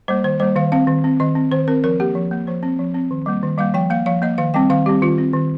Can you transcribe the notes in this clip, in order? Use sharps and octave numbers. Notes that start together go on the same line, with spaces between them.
G3 A#3 C5
D#3 C5
G3 A#3 C5
D#3 F5
C4 F5
D#3
C4
D#3 D#5
C4
D#3 C5
C4 A#4
F3 A#4
A#3 G4
F3
A#3
F3 C5
C4
F3
C4
D#3
G3 A#3
D#3
G3 A#3 F5
F3 G5
A#3 F5
F3 F5
A#3 D#5
D#3 F5
G3 C4 G5
D#3 F5
G3 C4 G4
D#3 F4
C4
D#3